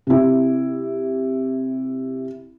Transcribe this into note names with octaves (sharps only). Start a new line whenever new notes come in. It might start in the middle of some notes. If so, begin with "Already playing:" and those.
C3 E4